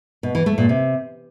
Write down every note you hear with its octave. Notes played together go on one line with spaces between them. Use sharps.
B2
E3
A3
A#2
C3